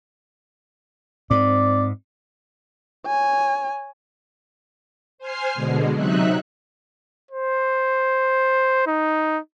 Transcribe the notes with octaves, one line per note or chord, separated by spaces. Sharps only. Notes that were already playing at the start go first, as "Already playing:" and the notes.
G#2 C4 D5
C#5 G#5
C5 G#5 F6 C7
B2 D3 G#3
C3 F#3 D#4 E5 F#6
C5
D#4